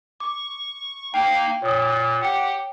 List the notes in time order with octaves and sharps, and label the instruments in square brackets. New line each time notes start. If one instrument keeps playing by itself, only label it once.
[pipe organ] C#6 [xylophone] D6
[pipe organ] A#3 D#4 F5 [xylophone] G5
[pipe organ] A#2 [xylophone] C#5 D#6
[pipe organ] G4 F#5 [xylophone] G5 C#7